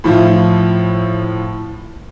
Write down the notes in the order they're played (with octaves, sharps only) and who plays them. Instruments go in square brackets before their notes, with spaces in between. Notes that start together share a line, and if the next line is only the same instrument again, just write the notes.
[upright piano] A2 F3 E4 F4